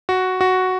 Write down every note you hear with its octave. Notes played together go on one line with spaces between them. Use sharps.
F#4
F#4